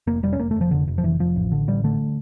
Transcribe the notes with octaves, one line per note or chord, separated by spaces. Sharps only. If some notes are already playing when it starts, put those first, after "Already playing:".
F1 A#3
F1 G3
C#4
F1 A#3
A3
F1 F3
F1 D3
F1
F3
F1 E3
F1 F3
A1
D3
A1 G3
D3 A3